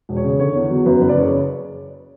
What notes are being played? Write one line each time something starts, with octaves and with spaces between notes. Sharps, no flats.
E1
C#5
C#3
D3 C#5
E2
F#3
F#2 B4
F#1 B4
D5
C#3 C#5